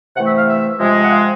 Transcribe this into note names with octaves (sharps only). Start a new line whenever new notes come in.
C3 E3 A3 F#5
E5
F5
E5
C3 F3 G#3
F#5
F5